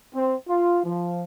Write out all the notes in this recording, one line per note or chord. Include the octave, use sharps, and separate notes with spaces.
C4
F4
F3